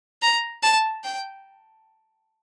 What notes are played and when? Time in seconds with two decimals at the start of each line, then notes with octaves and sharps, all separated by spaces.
0.22 A#5
0.63 A5
1.04 G5